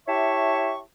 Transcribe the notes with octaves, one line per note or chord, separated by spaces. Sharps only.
E4 G4 C#5 E5 A5 C#6